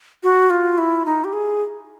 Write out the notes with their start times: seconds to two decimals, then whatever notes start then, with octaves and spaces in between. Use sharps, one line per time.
0.23 F#4
0.50 F4
0.78 E4
1.06 D#4
1.24 G4
1.33 G#4